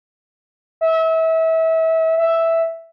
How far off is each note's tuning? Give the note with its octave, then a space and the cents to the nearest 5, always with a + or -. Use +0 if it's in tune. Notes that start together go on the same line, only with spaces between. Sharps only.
E5 -30
E5 +0